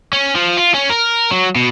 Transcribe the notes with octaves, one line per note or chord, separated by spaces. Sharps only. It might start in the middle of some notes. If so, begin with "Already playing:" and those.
C#4
F3
F4
C#4
A#4
F#3
B2